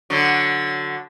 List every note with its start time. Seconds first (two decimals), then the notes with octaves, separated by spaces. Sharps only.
0.10 D3 F#3